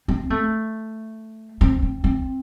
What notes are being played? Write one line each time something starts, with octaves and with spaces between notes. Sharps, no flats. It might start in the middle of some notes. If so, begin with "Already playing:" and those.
C4
A3
C4
C4
C4